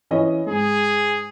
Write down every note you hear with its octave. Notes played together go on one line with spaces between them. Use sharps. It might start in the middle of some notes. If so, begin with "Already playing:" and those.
E3 C#4 D#5
G#2 G#4